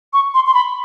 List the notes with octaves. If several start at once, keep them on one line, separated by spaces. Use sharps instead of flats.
C#6
C6
C6
B5